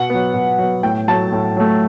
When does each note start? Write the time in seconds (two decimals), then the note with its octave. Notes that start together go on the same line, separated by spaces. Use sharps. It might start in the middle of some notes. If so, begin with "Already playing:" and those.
Already playing: B2 F#5
0.10 F#3 B3
0.34 B2
0.58 F#3 B3
0.83 A2 G5
1.08 F#3 A3 A5
1.32 A2
1.56 F#3 A3